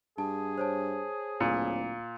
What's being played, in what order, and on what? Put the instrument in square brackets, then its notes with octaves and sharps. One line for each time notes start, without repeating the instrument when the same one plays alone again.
[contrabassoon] G2 [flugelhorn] G#4 [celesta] A5
[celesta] C5 C#5 A5
[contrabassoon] D1 [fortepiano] A#2